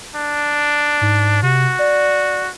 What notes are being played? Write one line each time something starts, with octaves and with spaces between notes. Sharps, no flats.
D4
G#2
C3 F#4
D5